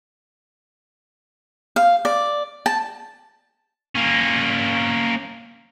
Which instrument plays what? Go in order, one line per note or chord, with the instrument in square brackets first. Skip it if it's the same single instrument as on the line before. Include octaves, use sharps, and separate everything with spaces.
[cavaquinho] F5
D5
A5
[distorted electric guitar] A#3 C#4